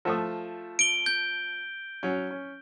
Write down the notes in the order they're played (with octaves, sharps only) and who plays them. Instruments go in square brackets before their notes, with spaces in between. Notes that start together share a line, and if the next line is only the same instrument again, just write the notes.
[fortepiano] F3 A3 D#6
[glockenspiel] D7 G7
G6
[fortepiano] F#3 C#4
C#4